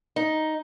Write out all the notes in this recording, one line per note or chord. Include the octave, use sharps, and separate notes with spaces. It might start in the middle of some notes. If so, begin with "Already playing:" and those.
D#4